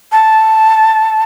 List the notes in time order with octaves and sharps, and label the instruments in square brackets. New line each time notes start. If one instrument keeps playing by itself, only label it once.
[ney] A5